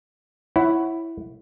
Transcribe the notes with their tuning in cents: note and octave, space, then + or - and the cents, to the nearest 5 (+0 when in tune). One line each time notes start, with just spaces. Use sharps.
E4 +0 C#5 -5 F#5 +15